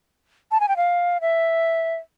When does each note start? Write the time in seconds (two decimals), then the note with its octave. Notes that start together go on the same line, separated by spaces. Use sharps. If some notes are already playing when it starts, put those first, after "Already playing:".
0.51 A5
0.60 G#5
0.68 G5
0.77 F5
1.21 E5